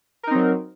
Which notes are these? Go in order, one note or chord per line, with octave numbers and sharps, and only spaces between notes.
F#3 C4 D#4 A#4